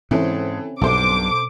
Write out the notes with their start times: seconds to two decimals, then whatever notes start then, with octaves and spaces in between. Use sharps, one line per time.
0.11 G#2 E3 C4 C#4 A4 C#5
0.81 B1 G2 B2 A4 C5 D6